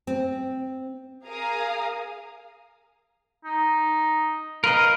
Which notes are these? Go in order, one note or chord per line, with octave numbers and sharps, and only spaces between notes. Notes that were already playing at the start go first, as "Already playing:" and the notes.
C4
G#4 A#4 F5 A#5 D#6
D#4
A#4 B4 D#5 F5